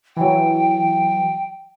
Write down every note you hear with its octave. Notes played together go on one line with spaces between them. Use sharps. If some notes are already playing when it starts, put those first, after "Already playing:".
E3 F#3 G5